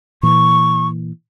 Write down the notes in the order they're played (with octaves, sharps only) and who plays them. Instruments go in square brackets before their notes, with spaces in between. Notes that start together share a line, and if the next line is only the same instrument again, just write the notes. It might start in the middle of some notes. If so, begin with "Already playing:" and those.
[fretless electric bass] A#2 E3 [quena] C#6